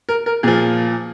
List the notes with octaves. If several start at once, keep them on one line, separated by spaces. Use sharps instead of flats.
A#4
A#4
A#2 F3 G#4